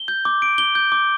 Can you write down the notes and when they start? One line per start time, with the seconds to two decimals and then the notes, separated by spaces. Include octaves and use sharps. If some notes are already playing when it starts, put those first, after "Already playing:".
Already playing: G7
0.08 G6
0.25 D6
0.42 D7
0.58 G7
0.75 G6
0.92 D6